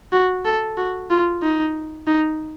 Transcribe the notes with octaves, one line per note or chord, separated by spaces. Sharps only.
F#4
A4
F#4
F4
D#4
D#4